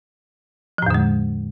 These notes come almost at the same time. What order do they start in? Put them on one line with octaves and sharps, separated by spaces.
F3 A2 E2 D3 G#3